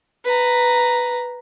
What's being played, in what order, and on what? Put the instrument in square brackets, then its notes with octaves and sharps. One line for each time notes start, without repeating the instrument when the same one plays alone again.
[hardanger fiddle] B4 A#5